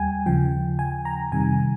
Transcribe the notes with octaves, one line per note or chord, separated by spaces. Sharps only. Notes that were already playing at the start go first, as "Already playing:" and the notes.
Already playing: D#2 G3 G5 G#5
D#2 C#3 F3 G5
G#5
A#5
F2 C3 D#3 G3 G#5